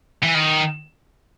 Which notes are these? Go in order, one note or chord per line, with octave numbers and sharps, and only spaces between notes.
E3
D#3